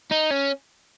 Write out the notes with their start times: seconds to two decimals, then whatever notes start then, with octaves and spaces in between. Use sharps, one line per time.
0.11 D#4
0.31 C#4